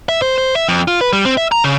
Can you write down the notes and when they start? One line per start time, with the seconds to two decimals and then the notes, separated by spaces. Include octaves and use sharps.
0.09 E5
0.22 C5
0.38 C5
0.56 E5
0.68 F2
0.88 F4
1.01 B4
1.13 G3
1.25 C4
1.37 E5
1.52 A#5
1.64 C#3